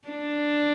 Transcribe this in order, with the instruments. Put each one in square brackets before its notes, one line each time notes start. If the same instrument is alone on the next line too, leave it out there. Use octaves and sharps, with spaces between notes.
[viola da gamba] D4